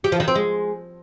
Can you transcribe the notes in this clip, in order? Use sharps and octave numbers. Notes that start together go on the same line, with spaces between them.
G4
F3
D#3
C4
G#3